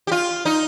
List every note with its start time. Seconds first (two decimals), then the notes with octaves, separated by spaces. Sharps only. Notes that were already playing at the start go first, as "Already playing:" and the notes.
0.07 G4
0.11 F4
0.45 D#4